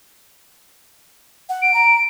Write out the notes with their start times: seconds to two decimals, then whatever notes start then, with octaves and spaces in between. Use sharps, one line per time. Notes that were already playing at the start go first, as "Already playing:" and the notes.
1.49 F#5
1.62 D7
1.74 A#5